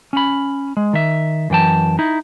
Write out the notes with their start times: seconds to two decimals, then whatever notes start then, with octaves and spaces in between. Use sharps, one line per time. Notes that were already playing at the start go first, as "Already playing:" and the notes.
0.13 C#4 B5
0.77 G#3
0.93 D#3 E5
1.50 F#2 E3 G5 A5
1.99 D#4 E4